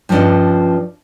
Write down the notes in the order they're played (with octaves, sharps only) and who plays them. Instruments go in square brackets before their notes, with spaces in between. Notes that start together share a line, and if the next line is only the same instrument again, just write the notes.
[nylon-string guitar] G2 F3 C#4 D4 D#5